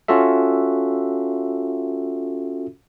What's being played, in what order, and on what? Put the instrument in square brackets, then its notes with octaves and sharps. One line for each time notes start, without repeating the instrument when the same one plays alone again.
[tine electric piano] C#4 F4 F#4 A4 E5